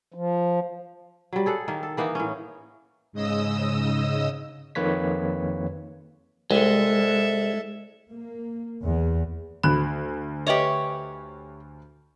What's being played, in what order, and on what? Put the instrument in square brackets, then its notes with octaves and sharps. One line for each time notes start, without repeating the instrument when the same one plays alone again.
[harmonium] F3
[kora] F#3 G3
G#4 A4 F#5
D#3 A#3
A4
E3 A#3 B3 D#4
A2 C#4
[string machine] G#2 C#3 D#5 D#6 E6
[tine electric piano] F2 D#3 A#3 B4 C#5 B6
[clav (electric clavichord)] C2 [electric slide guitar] G#3 [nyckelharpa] A4 E5
[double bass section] A#3
E2
[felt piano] D2 F#6 [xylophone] B5
[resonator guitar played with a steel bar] G4 C#5 [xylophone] B4 D#5 E5